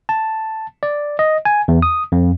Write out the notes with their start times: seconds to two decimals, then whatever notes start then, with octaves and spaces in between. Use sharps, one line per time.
0.09 A5
0.83 D5
1.19 D#5
1.45 G#5
1.68 E2
1.82 D#6
2.12 F2